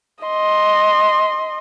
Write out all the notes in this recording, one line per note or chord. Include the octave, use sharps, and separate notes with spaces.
D#5 C6